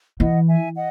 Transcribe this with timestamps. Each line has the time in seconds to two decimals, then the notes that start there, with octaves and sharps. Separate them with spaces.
0.20 E3 D#5 F#5
0.48 E5 G#5
0.75 D#5 F#5